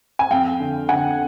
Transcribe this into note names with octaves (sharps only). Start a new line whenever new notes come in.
G#5
F2 F5 G5
D3
D3 F#5 G#5